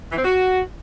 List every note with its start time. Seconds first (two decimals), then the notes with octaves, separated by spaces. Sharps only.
0.12 E3
0.18 C4
0.24 F#4